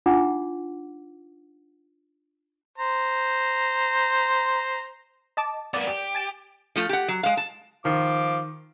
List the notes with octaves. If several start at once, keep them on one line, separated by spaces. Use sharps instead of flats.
D4 D#4 F4 F#5 D6
C5 A#5
D#5 A5 D6
A#3 B3 D5
G4
G#5 A6 E7
F3 A3 F4
G4 F#5
F#3
G#3 F5
A5
D#3 F3 D6